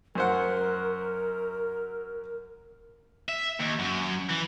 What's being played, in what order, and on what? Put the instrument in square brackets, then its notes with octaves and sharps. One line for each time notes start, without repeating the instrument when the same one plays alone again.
[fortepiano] F#2 C5 F#5 [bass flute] A#4
[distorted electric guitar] E5
D#2
F#2
E3